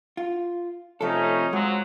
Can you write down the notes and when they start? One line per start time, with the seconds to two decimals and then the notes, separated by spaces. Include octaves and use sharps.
0.17 F4
1.01 C3 F3 A3 C#4 D#4 A4
1.53 F3 F#3 G#3